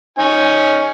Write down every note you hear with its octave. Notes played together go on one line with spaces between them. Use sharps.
C#4 D#4 G#5